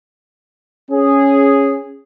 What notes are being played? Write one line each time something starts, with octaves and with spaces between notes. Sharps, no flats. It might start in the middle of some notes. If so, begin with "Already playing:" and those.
C#4 G#4